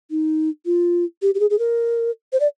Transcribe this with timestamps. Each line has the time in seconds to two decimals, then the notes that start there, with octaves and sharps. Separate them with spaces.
0.10 D#4
0.66 F4
1.22 G4
1.35 G4
1.40 G#4
1.50 G#4
1.59 A#4
2.33 C5
2.40 D5